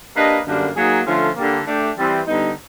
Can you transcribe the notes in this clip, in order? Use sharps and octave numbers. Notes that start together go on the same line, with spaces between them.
A#3 D4 G4 B4 D#5
F#2 D3 G3 A#3 D4
F#3 A#3 D#4 G#4
D3 F3 A3 C#4 F4
D3 G3 A#3
A3 D4 G4
E3 G3 C4
D3 G3 B3 D#4